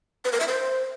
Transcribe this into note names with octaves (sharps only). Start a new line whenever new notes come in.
B4
A#4
E5
C5